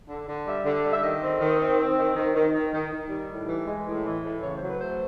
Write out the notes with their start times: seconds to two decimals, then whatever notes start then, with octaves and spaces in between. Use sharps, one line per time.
0.09 D3
0.27 D3
0.46 G3 E5
0.65 D3
0.84 G3
0.92 E5
1.03 D#3 D#5
1.22 C4
1.40 D#3
1.59 C4
1.78 C4
1.97 D#3
2.15 D#3
2.35 D#3
2.54 D#3
2.72 D#3
2.91 D#3
3.10 G3
3.29 A2
3.47 E3
3.66 G#3
3.85 A2
4.04 E3
4.23 A2
4.42 C#3 C#5
4.55 C5
4.61 F#3
4.68 B4
4.79 A3 C5